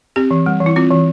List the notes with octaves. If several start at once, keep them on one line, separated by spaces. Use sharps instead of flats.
C4 G4
E3
G3
E3
E4
C4 F4
E3